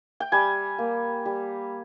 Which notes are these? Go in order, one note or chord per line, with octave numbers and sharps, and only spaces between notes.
G5
G3 G#5
A#3
G3